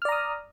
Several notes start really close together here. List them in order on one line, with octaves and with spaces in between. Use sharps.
F6 D5 A#5 D#6